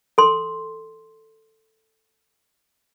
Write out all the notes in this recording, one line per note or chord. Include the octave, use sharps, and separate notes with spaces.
A4 C6